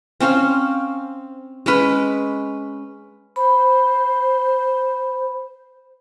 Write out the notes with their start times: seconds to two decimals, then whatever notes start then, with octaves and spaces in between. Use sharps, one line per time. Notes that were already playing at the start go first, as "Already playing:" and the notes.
0.20 C4 C#4 C5 F5
1.66 G#3 C#4 B4
3.36 C5 B5